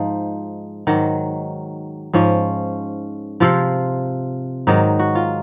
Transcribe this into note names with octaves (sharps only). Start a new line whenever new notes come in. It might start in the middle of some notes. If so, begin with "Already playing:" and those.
Already playing: G#2 F3 D#4
G#2 D#3 F#3
G#2 F3 C#4
C3 F3 F4
G#2 D#3 F#3 D#4
F#4
F4